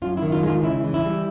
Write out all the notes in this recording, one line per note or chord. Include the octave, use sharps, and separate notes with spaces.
F#2 F4
E4
D#3
F4
G#3 F4
C#3 E4
E3
E4
G3